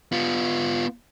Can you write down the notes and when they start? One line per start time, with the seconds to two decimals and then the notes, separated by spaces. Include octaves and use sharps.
0.12 B3 F4